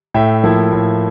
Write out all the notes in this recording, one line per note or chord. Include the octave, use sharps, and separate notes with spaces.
A2 E5 G5
F3 A#3 E4
A2